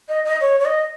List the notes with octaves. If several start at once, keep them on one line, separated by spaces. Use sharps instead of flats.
D#5
D#5
C#5
C#5
D#5